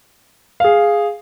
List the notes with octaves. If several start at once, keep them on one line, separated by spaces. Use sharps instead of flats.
G#4 F5